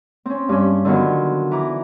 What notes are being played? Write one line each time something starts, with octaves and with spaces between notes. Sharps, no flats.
C4 C#4
G2 C#4
D3 D#3 F3 F#3 B3
E3 A#5 D6